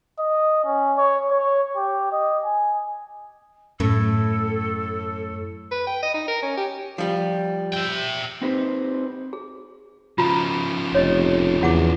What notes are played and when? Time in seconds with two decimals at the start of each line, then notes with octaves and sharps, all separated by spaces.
0.19 D#5
0.65 C#4
0.98 C#5
1.31 C#5
1.76 G4
2.12 D#5
2.45 G#5
3.80 F#2 A2 A4
5.71 B4
5.87 G5
6.03 D#5
6.14 D#4
6.28 A#4
6.42 C#4
6.57 G4
6.98 F3 G3
7.74 E5 G5
8.42 C4 D#4 G4 B4 C5
9.33 G#4
10.18 C#3 F3 F4 A#5
10.95 F1 C#5 D#5
11.61 E2 E4 F#5 D6